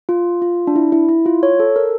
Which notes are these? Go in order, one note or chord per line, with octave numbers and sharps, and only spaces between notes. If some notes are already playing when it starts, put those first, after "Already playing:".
F4
F4
D4
E4
E4
E4
F4
C#5
A4
A#4